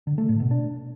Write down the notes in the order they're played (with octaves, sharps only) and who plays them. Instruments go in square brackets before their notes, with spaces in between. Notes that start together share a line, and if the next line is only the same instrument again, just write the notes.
[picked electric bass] D3
A3
A2
B2
D4